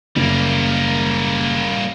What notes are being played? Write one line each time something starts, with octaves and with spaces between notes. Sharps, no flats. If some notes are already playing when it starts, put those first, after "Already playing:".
F#1 G3 A#3